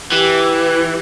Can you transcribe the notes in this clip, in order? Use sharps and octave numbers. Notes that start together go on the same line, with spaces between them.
E3 G4